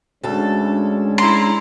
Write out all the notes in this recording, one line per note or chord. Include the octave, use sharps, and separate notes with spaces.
D2 G#3 C#4 D4 A4
E4 A#5 C6